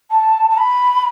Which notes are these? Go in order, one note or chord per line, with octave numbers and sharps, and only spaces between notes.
A5
A5
B5